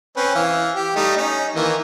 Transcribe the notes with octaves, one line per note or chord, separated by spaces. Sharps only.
C4 C#4 B4
E3 F5
G4
G3 A3 D#4
C#4 D#4
D#3 E3 A#3